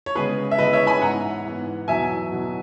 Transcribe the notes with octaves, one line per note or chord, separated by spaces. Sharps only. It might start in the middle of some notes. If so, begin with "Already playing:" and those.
C#5
C#3 G#3 B3 G#4 B4
E5
C#3 G#3 B3 B4 D#5
C#5 E5
G#5 B5
G#2 E3 B3 F#5 A#5
G#2 E3 B3
E2 B2 F#3 B3 E5 G#5
E2 B2 F#3 B3